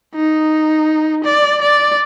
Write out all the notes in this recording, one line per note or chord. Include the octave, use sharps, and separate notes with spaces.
D#4
D5
D5